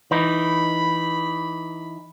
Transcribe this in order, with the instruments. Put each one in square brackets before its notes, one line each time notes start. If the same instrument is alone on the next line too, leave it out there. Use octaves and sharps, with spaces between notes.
[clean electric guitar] E3 D#4 [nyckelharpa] B5